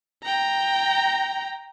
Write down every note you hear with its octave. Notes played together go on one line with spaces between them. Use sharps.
G5 A#5